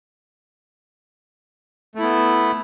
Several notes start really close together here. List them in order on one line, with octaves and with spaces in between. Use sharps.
A3 E4 B3